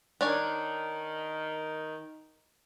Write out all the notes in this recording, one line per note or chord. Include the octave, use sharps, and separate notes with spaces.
D#3 D4 C#5 G#5